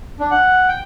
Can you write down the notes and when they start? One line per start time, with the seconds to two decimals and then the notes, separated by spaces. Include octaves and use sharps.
0.20 D4
0.31 F#5
0.68 G5